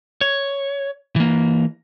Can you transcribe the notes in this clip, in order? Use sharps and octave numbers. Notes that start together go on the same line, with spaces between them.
C#5
E3 A#3